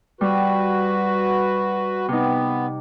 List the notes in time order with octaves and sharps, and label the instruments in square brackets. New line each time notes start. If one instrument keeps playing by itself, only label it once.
[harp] G3 [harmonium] F#4 B4
[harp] C3 D#4 [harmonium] B3